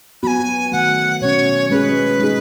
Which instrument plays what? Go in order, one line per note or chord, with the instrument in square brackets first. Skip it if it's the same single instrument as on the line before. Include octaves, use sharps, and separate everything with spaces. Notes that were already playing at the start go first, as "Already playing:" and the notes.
[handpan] F#3 B3 F#4 [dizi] G#5 B5
[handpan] D#3 F#3 A3 [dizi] F#5
[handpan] B2 F#3 C#4 [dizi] C#5
[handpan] G#3 C#4 G#4 [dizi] B4
[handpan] G#3 D#4 G#4